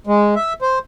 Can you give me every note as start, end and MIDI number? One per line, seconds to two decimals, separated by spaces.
0.07 0.34 56
0.36 0.53 76
0.62 0.79 72